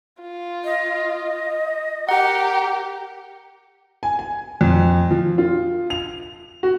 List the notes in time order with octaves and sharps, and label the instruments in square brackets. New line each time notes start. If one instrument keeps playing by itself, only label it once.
[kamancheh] F4
[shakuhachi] D#5
[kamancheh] G4 A#4 [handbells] F#5 [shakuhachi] A#5
[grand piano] G#5
G#5
F2
F3
F4
F7
F#4